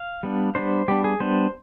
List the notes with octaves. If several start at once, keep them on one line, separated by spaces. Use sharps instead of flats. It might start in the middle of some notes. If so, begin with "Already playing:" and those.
Already playing: F5
G3 B3 D4
G3 B3 D4 C5
G3 B3 D4 G4
G#4
G3 B3 D4 C5